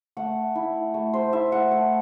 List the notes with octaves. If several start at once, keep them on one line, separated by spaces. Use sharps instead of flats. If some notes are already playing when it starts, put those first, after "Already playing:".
A3 F#5
E4
A3
C5
E4 E5
F#5
A3